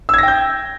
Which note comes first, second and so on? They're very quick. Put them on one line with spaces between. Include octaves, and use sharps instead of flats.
E6 G#6 A#6 G5 G6